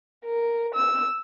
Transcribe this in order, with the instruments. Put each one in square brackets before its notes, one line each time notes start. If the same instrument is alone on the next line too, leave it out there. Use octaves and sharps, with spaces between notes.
[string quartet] A#4
E6